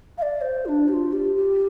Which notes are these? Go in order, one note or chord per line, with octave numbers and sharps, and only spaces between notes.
F5
D5
C5
F4
D4
G4
F4
G4
G4